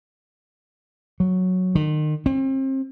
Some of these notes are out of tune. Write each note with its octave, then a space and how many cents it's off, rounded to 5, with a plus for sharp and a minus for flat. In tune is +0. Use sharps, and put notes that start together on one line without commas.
F#3 -5
D#3 -35
C4 +35